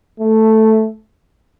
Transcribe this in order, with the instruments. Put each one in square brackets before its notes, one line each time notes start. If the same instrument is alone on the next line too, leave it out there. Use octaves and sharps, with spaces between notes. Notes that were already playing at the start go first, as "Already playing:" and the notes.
[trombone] A3